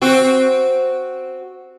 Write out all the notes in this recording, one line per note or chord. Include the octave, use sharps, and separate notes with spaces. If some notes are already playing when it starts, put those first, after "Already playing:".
C4 F#4